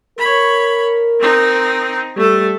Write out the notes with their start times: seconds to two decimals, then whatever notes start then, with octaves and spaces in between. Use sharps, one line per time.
0.18 A#4 C#5 B5
1.20 C4 D#4
2.16 G3 A3 A4